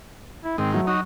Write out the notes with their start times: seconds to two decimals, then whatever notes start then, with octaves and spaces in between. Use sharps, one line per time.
0.44 E4
0.58 G#2 D#3 C4
0.74 F#3 A3
0.87 D#4 F#4